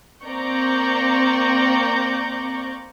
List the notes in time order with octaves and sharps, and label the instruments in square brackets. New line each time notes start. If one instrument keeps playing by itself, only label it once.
[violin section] A#3 C4 D5 A#5 C#6 G6